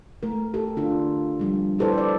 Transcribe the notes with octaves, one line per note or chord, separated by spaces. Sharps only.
A3 A#4
G4 A4
D3 D4 F4
F3 G3 D4
E4 G4 A4 B4 C5 D5
D5